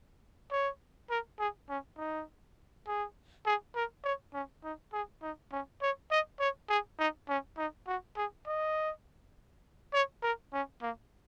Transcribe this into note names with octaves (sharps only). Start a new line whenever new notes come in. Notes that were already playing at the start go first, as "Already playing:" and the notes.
C#5
A#4
G#4
C#4
D#4
G#4
G#4
A#4
C#5
C#4
D#4
G#4
D#4
C#4
C#5
D#5
C#5
G#4
D#4
C#4
D#4
F#4
G#4
D#5
C#5
A#4
C#4
A#3